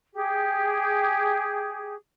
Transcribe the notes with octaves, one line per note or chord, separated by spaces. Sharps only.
G4 G#4